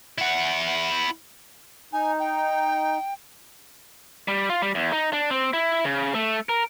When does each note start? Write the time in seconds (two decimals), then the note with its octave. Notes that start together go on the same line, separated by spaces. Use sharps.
0.18 E4 F#5
1.93 D#4 G#5
2.19 G5
4.28 G3
4.49 F4
4.62 G3
4.75 E2
4.92 D#4
5.13 D4
5.30 C4
5.53 E4
5.85 C#3
6.15 A3
6.49 A#4